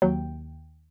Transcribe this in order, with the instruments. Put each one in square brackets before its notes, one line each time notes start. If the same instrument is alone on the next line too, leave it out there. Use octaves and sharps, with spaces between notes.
[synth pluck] D#2 G5 [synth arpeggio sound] F#3